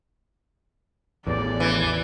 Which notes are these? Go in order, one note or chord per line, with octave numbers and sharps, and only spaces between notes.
A1 E2 D5
E3